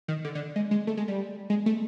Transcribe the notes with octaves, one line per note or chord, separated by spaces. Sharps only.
D#3
D3
D3
G#3
G#3
A3
G#3
G3
G#3
A3